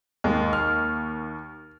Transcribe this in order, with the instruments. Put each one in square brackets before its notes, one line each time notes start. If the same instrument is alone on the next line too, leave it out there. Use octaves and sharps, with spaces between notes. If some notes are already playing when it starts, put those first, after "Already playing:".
[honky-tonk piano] D#2 [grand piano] G#3
[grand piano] F6